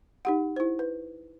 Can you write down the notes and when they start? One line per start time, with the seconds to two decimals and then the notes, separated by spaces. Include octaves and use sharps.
0.25 D#4 G4 F#5
0.56 E4 C5
0.79 B4